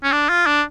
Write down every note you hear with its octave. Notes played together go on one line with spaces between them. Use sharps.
C#4
D4
F4
D4